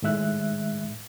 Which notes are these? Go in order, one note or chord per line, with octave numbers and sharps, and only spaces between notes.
A2 D#3 G#3 E5 F#6